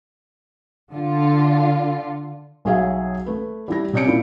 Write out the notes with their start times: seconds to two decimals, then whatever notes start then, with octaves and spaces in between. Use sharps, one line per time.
0.92 D3 F4
2.65 B1 F#3 G#4 E5 F5
3.26 A3 B4
3.68 G3 E4 A#6
3.93 C3 C#4 D5 G6 C#7 D7
4.06 A#2 E4